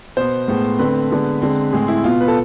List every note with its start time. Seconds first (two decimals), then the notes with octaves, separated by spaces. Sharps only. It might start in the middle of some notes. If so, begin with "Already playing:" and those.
0.17 B2 B3 C5
0.48 A2 G#3 B3
0.79 D3 A3 C4 B4
1.10 D3 G#3 B3
1.42 D3 G#3 C4
1.73 A2 G#3 C4 G#4
1.88 E4
2.04 B2 B3 F4
2.21 B4
2.28 A4